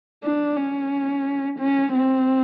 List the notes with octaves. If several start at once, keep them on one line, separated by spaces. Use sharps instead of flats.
D4
C#4
C#4
C4